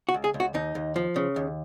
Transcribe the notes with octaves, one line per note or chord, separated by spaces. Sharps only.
F#4
C#2
G#4
C#2
F#4
D#2 D#4
D#2
F3
C#3
D#2